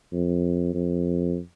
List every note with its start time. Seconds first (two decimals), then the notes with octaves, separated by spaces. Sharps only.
0.13 F2
0.74 F2